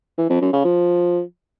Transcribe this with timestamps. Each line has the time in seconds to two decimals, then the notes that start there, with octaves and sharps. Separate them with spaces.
0.18 E3
0.29 F2
0.41 F#2
0.53 C#3
0.65 F3